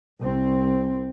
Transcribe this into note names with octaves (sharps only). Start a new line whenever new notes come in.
C2 C4